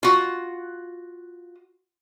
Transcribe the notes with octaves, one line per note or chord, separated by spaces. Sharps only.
F4 F#4